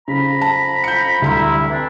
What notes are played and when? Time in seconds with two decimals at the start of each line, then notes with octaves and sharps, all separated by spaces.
0.08 F2 C#3 A#5 B5
0.41 A5
0.84 G6 C#7
1.22 D2 G3 E4 A#5 C6
1.70 E3 C4 D4